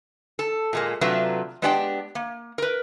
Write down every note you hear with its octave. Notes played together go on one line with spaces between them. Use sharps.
A4
A#2 G#3 A#3
C3 F#3 A3 D4 F4 B4
G#3 B3 D4 G4 D5 G5
A#3
A#4 B4